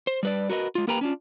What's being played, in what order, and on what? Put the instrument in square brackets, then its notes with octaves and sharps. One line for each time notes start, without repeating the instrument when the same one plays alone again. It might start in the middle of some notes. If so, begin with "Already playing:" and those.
[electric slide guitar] C5
G3 B4 D5
F#4 A#4 B4 D5 D#5
G#3 F4
A#3 G4 A#4 B4 G5 A#5
C#4 D4 F4